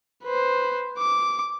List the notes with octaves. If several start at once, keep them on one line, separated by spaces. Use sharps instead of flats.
B4 C5
D6